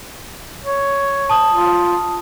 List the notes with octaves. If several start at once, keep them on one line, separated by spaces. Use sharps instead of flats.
C#5
A5 D#6
F4